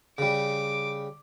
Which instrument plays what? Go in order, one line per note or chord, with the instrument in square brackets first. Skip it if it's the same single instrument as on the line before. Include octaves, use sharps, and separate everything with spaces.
[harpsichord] C#3 G3 [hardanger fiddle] D6